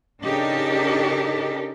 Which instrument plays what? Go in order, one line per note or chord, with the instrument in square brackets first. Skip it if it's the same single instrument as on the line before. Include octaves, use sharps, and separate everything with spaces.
[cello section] C#3 D4 D#4 G4 A4 A#4